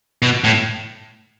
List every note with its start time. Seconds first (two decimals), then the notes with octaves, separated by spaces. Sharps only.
0.22 B2
0.44 A2